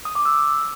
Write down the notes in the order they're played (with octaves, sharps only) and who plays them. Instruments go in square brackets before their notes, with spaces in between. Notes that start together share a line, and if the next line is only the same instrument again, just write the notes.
[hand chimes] D#6
D6
E6